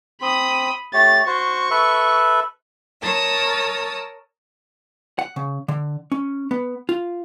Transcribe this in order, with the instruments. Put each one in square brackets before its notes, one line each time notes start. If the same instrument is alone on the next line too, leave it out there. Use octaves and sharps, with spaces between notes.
[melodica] C4 C6 [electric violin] B5 D#6
[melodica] A3 G4 C#5 [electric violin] A6
[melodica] F#4 C5 [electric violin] C#6
[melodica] A4 B4 E5
[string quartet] A#4 C#5 A5 D#6 E6
[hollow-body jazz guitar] F#5
C#3
D3
C#4
B3
F4